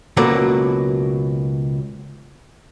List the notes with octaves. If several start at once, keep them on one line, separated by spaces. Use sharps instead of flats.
C#2 B2 F#3 A#3 A4 D5